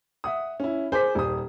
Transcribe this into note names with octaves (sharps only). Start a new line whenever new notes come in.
E5 F#5 D#6
C#4 E4
G#4 C5 D6 B6
D#1 D#6